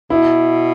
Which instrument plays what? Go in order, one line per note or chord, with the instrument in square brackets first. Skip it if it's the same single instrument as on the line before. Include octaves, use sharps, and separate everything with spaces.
[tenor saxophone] B2 [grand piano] E4